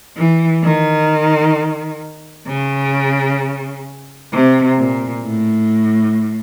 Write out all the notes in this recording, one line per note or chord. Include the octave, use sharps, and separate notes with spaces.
E3
D#3
C#3
C3
A#2
A2